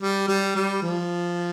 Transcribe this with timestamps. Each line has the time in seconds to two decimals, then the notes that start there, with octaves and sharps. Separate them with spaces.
0.01 G3
0.28 G3
0.55 G3
0.82 F3